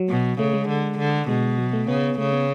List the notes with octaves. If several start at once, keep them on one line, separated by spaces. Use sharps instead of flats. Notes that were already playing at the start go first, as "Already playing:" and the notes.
Already playing: F#3
B2
C#3 A3
G#3
D3
D3
B2 G#3
F#3
A3
C#3 B3
C#3 A3
B3